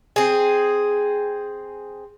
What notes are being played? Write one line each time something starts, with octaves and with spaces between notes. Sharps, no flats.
C4 G#4